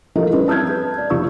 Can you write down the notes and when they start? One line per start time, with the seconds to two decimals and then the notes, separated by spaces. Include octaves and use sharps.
0.15 F3 E4 G4 A4 A#4 D#5
0.33 G3 C4 C#4 E4 B4
0.48 A5 E6 F6 G6 G#6
0.69 B4
0.98 D5
1.10 F1 F4 C#6 E6